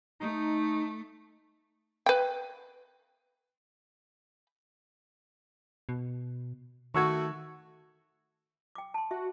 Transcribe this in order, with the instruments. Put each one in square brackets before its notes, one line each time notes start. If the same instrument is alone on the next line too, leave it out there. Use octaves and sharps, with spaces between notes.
[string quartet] A3 [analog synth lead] D#4
[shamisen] B4 G5
[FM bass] B2
[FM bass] D#3 [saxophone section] A3 F#4 [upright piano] C#6 E6 G#6
[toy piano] G5 D6
A5 C6
[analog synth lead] F#4 [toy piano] E5